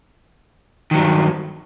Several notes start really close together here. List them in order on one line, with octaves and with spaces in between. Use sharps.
D#3 F#3 G2